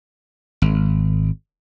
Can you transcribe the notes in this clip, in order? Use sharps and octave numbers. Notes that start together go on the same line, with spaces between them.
G#1